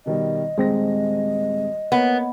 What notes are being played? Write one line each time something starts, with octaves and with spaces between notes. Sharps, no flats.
B2 D#3 G3 D#5
D#1 G#3 C4 A#6
A#3 B3 C#5